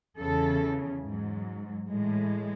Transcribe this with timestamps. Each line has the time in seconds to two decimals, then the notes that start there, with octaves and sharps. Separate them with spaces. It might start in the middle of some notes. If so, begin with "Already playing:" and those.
0.18 E2 C#3 E3 A4
1.04 G#2 F#3
1.89 A2 E3 G#3